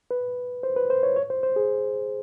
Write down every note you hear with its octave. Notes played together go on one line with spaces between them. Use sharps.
B4
C5
B4
C5
C#5
C#5
C5
C5
G#4